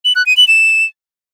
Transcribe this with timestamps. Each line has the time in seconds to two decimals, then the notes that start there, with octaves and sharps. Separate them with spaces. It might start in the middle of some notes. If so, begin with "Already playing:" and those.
0.05 F#7
0.16 F#6
0.26 D#7
0.37 F#7
0.48 E7